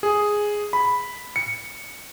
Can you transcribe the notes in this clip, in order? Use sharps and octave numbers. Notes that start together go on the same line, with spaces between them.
G#4
B5
C#7